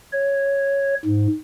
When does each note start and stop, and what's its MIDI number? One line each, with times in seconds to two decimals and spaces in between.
0.12 0.94 73
1.05 1.27 44